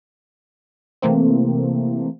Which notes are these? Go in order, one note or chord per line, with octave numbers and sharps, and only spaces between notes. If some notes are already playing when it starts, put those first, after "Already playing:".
C3 E3 A3 A#3 C4